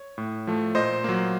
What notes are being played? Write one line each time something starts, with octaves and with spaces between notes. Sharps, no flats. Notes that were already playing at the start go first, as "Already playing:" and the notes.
Already playing: C#5
A2
F3 A3
A#2 C5 D#5
F#3 A#3